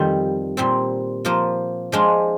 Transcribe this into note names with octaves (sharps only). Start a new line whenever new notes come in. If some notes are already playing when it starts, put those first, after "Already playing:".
Already playing: F2 D#3 G3
A#2 G3 C4
F3 A#3 F4
F3 G#3 D4 F4